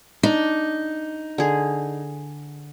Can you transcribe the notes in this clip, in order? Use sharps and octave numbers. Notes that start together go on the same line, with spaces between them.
D4 D#4
D3 G#4